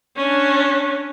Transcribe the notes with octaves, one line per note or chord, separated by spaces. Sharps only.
C#4 D4